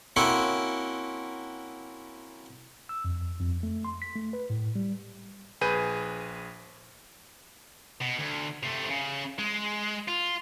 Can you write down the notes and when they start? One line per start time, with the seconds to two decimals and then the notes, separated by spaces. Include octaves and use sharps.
0.16 A#3 C4 C#4 E4 F#4 A#4
2.89 E6
3.05 F2
3.40 F2
3.63 A3
3.85 C6
4.02 B6
4.16 A3
4.33 B4
4.50 A2
4.75 G3
5.61 A#1 G#4 B4 G6 D#7
8.01 B2
8.18 D2
8.63 C3 A3
8.90 C#3
9.39 G#3
10.08 F4